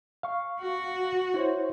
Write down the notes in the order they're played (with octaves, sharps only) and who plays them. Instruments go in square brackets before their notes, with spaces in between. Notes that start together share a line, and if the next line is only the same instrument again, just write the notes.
[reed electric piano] F5 C#6
[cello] F#4
[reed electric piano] E4 C5 C#5